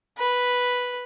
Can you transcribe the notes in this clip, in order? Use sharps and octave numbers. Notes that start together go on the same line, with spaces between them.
B4